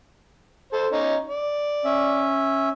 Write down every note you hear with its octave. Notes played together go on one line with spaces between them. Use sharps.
A4 C5
C#4 D#4
D5
C#4 E5